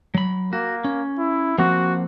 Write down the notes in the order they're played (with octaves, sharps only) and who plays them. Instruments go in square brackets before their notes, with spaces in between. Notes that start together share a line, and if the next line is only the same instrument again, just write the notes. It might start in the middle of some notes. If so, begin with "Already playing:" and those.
[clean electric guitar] F#3 B5
[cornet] A#3 [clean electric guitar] F#4
[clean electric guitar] C#4
[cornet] E4
[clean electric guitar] F3 A#3 C4 [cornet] F#4